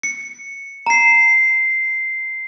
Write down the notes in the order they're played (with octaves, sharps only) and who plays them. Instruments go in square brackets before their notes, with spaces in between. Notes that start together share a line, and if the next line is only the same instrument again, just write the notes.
[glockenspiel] C#7
A#5 C7